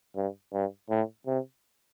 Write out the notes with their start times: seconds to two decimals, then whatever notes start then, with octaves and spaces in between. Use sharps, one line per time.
0.16 G2
0.53 G2
0.90 A2
1.27 C3